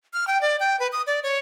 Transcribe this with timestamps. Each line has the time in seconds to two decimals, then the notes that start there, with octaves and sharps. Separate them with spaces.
0.14 F6
0.27 G5
0.41 D5
0.60 G5
0.80 B4
0.92 D#6
1.07 D5
1.23 C#5